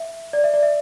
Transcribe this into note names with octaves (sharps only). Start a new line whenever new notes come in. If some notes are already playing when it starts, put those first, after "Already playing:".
Already playing: E5
D5
E5
D5
E5